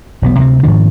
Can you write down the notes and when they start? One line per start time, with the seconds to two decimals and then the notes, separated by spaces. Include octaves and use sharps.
0.22 E1 B1 B3
0.38 D2 C3 G#3 C4
0.63 G#2 D#3 F3 D4